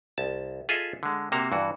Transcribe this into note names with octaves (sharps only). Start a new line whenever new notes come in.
C2 A5
F4 G#4 A4 D#5 E5
D3 G#3
C3 A#3 F#4 A5 A#5
G2 E3 F#4